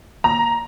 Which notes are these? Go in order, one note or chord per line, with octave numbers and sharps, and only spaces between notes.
A#5